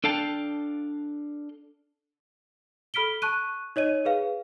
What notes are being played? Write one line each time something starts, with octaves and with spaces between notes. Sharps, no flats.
D4 A4 F5 G5 A5
A4 B5 F6 B6 D7 G7
A5 C#6 F#6 D#7
D#4 C#5 D#5 D#7
G#4 B4 F5